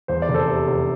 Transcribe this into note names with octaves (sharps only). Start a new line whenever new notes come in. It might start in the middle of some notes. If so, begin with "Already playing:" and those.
E2 C5
D5
F1
A4 C5
C3
F1